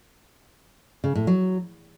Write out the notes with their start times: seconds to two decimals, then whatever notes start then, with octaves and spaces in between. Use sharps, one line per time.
1.04 C#3
1.15 A2
1.27 F#3